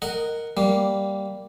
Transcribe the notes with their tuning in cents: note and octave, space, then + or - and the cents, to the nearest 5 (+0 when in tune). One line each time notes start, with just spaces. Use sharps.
A#4 -10 D#5 +0 F#5 +0
G3 +0 A#3 +0